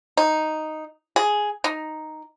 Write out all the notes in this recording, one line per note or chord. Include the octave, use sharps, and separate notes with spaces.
D#4
G#4
D#4